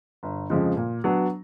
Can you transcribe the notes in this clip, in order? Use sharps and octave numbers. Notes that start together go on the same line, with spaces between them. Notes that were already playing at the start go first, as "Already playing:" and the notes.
G1
F2 C#3 F3 G#3
A#2
F#3 B3 D4